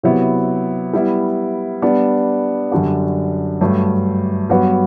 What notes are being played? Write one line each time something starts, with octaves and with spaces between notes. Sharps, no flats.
C3 F#3 B3 E4
G3 B3 E4
G3 B3 D4
F#2 D3 G3 D4 F#4
G2 F#3 A3
G2 F#3 B3 F#4 B4